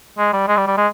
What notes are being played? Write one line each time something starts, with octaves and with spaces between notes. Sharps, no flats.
G#3
G3
G#3
G3
G3
G#3